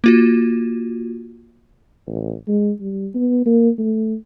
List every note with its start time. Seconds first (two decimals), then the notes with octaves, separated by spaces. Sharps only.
0.04 A#3 F4 F#4
2.07 A1
2.48 G#3
2.80 G3
3.15 B3
3.46 A#3
3.78 A3